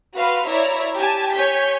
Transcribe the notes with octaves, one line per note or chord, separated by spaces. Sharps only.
F#4 B4 F5 C6
E4 C#5 D5 E5 A#5
G4 G#5 A5
C#5 G#5 G6 B6